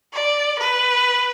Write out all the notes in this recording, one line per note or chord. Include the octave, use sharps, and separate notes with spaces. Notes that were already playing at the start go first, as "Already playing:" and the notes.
D5
B4